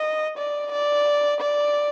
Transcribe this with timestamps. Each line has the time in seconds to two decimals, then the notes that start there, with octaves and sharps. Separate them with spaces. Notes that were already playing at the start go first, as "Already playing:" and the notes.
Already playing: D#5
0.38 D5
0.72 D5
1.41 D5